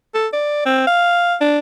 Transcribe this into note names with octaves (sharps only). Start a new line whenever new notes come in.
A4
D5
C4
F5
D4